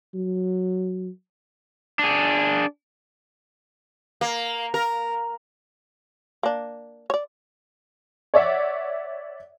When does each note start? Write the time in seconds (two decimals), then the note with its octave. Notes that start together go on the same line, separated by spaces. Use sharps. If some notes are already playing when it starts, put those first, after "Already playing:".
0.14 F#3
1.99 D4 G#4
4.21 A#3
4.74 A#4
6.43 A#3 D4
7.10 C#5 D5
8.34 C#5 D5 E5 F#5